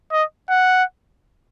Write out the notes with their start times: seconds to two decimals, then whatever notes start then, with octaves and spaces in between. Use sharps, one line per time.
0.12 D#5
0.49 F#5